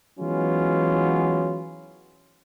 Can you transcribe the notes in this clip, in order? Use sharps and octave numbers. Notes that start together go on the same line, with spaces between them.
E3 F#3 G#3 B3 C#4 F4